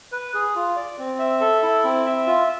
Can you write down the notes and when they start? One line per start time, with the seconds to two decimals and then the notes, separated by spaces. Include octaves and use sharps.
0.12 B4
0.34 G#4
0.56 F4
0.76 D5
0.99 C4
1.19 E5
1.41 A4
1.63 E4
1.84 C4
2.06 E5
2.27 F4